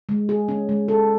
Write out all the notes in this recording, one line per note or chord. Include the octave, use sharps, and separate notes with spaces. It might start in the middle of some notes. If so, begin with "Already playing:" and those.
G#3
G#4
C#4
G#3
A4